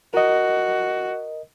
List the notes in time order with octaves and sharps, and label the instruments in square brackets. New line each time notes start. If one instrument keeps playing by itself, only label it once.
[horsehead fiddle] F#4 [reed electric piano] A#4 D#5